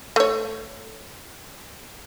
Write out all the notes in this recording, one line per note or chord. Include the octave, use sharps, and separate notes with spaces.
A3 C#5